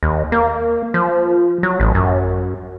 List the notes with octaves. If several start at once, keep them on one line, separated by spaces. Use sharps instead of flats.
D#2
A#3
F3
F#3
A1
F#2